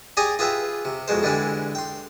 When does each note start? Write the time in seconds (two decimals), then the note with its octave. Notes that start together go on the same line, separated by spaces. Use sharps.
0.17 G4 G#4 D5 G#5 A#5 D#6
0.39 F4 G#4 B4 E5 G5
0.85 C3
1.08 F2 B2 G#3 C5
1.23 D3 E3 G3 G#3 G4
1.75 G5 C6